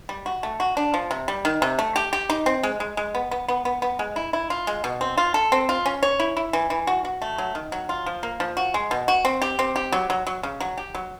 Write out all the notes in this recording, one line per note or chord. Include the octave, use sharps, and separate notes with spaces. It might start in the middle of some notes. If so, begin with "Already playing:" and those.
G3
F#4
A3
F#4
D4
F3
C3
G3
D#3
C3
A3
G4
G4
D#4
C4
G#3
G#3
G#3
B3
B3
B3
B3
B3
G#3
E4
E4
F4
G#3
B2
C4
F4
A4
C4
F4
C#4
C#5
E4
E4
E3
E3
F#4
F#4
A3
F#3
D#3
F#3
F4
F3
A#3
F3
F#4
G#3
B2
F#4
C4
G4
C4
G4
F#3
F#3
F#3
C#3
F#3
G4
F#3